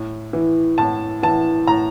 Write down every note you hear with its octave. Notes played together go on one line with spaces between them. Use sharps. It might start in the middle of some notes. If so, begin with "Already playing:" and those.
Already playing: A2
E3
A2 A5
E3 A5
A2 A#5